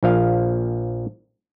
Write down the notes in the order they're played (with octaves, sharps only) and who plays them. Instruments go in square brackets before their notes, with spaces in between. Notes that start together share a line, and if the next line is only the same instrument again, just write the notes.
[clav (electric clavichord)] A#1 F3 F5